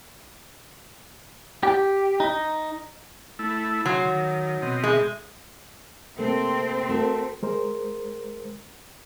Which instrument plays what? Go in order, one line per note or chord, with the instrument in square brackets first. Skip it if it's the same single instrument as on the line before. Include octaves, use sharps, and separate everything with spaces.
[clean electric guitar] G4
D#4
[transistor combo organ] A3 E4
[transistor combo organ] C#3 G#5 C6 [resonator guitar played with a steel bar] F#3
[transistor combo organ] D#3
B2 C4 D#5
[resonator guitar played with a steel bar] G#3
[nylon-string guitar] C3 A3 A#3 [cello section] C4
[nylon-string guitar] A3 F#4 A#4
[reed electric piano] G#3 A#4 C5